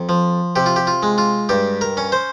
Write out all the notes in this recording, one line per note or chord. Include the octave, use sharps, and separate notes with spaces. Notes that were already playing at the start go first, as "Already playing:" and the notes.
Already playing: F2
F3
C3 G4
F4
G4
F4
G#3
F4
G2 G4
A#4
C#4
C5